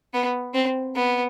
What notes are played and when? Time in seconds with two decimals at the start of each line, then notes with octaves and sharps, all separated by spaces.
0.14 B3
0.54 C4
0.95 B3